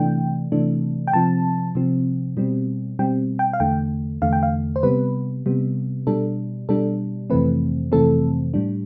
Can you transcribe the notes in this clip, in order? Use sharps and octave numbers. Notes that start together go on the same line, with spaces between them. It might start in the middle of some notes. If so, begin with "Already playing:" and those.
Already playing: C3 E3 A3 D4 G5
C3 E3 A3 D4
G5
C3 F3 C4 A5
C3 F3 C4
B2 G3 C4
B2 G3 C4 G5
G5
F5
E2 D3 A3 G5
E2 D3 A3 F5
G5
F5
C5
C3 G3 B3 B4
C3 G3 B3
B2 G3 D4 A4
B2 G3 D4 A4
F2 C3 E3 A3 C4 B4
F2 C3 E3 A3 C4 A4
A2 G3 D4